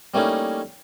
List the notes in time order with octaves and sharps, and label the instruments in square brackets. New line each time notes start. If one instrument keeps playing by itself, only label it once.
[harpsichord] G3 A3 A#3 C#4 D#4 E4